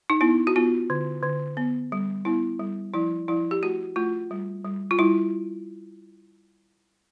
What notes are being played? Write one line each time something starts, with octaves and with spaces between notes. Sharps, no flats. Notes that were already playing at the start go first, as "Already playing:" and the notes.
D#4
B3 E4
F#4
B3 F4
D3
D3
B3
G3
B3 E4
G3
F3 E4
F3 E4
G4
A3 F#4
A3 F4
G3
G3
F4
G3 E4